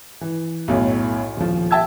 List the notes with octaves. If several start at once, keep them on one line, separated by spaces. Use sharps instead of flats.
E3
B1 F#2 A2
D#1 F3
E5 G5 A5 E6 G#6